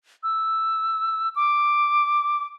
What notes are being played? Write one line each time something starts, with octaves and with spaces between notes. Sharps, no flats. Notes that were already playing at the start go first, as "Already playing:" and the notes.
E6
D6